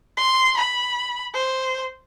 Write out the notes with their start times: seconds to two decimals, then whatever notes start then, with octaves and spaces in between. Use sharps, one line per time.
0.17 C6
0.57 B5
1.34 C5